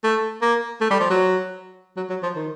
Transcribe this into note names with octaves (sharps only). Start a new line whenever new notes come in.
A3
A#3
A3
G3
F3
F#3
F#3
F#3
F3
D#3